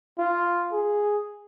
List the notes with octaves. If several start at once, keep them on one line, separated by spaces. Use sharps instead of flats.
F4
G#4